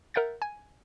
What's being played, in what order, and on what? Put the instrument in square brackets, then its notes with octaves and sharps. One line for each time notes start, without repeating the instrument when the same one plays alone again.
[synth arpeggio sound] A#4 E5 F#5 G6 A6
G#5